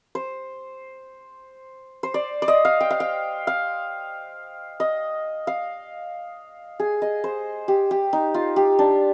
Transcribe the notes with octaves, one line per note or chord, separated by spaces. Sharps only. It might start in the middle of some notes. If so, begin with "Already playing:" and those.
C5
C5
D5
D5
D#5
F5
G5
F5
G5
F5
D#5
F5
G#4
D#5
C5
G4
G4
D#4
F4
G4
D4